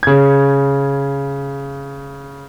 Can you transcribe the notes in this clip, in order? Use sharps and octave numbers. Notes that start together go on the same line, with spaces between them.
C#3 G#6